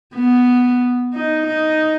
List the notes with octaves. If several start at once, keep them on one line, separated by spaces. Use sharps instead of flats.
B3
D#4
D#4